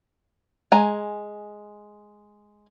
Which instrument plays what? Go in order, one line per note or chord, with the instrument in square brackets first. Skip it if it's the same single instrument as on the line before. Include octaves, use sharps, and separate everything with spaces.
[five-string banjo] G#3 G#5 A#5